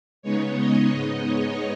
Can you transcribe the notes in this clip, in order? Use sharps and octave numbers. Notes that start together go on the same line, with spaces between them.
C#3 G#3 B3 D#4 C#5
D#5
G#2 G#3 B3 D#4
C#5